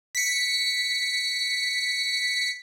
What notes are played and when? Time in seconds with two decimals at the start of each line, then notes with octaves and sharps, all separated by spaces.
0.15 B6 C#7